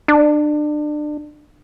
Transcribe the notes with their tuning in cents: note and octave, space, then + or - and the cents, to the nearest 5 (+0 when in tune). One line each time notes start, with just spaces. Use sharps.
D4 +30